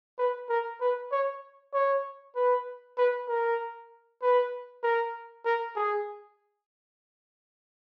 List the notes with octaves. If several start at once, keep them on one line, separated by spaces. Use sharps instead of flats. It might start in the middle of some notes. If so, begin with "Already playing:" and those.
B4
A#4
B4
C#5
C#5
B4
B4
A#4
B4
A#4
A#4
G#4